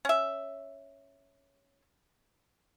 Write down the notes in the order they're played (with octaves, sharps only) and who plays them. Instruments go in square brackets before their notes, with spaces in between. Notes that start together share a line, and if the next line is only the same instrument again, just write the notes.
[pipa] C#4 E5